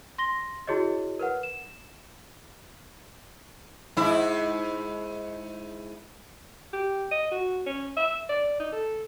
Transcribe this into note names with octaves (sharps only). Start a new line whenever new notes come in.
C6 A#6 G7
E4 F#4 G#4 C#5 D#5
A#4 B4 F#5
E7
G#2 E4
G4
D#5
F#4
C#4
E5
D5
D#4
A4